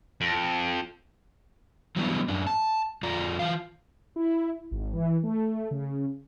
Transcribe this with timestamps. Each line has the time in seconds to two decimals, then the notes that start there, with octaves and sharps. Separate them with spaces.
0.21 F2
1.96 E3 F#3 G3 B3 C4 D4
2.28 F#2 D4
2.47 A5
3.03 F2 F4 D5 A#5
3.39 E3 F4 F5
4.16 E4
4.71 G#1
4.94 E3
5.23 A3
5.71 C#3